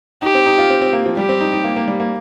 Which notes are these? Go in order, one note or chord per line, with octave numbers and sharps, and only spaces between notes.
D#4 G4
C4
D#4
F4
C4
C4
A#3
F3
G3 G4
C4
D#4
D#4
A#3
A#3
G3
A#3